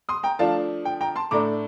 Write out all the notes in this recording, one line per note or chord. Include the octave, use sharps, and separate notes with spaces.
C6 D#6
G5 A#5
F3 A3 D4 F5 A5
G5
G5 A#5
A5 C6
A2 A3 D4 A#5 D6